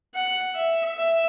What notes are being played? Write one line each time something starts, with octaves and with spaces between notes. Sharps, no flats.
F#5
E5
E5